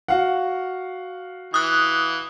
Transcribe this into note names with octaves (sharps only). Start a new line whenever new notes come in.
F#4 F5 F#5
E3 D#6 F#6